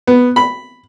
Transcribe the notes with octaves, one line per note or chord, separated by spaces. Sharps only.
B3
B5